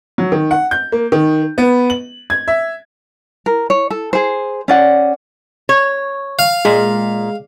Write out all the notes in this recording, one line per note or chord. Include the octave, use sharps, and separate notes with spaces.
F#3
D#3
F#5
G6
A#3
D#3
B3
F#7
G#6
E5
A#4
C#5
A4
G#4 C5
C#4 D5 F#5
C#5
F5
A#2 G#3